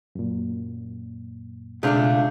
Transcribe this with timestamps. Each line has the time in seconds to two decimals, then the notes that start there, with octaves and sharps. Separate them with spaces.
0.15 F#2 A#2
1.83 C#2 B2 A3 D4 G#4 D5 F5 G6